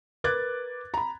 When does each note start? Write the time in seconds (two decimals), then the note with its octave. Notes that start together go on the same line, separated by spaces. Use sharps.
0.24 A#4 B4 D6 F#6 G#6 A6
0.94 A#5 B5